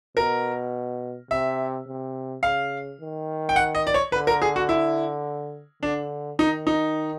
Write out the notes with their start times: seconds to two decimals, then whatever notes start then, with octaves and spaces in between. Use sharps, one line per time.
0.17 B2 A#4
1.30 C3 E5
1.87 C3
2.43 C#3 F5
3.00 D#3
3.49 G5
3.56 F#5
3.75 D#5
3.87 D5
3.94 C#5
4.12 D3 B4
4.27 A#4
4.42 G#4
4.56 F#4
4.69 E4
5.83 D3 D4
6.39 D#3 D#4
6.67 D#4